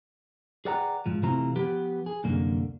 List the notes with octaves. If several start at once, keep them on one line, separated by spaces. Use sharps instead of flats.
G#4 B4 D5 F#5 G5 A#5
G#2 F3
C3 E3 A3 C4 F4 A#5
F3 B3 G4 B4
G#4
C2 F#2 D3 A#3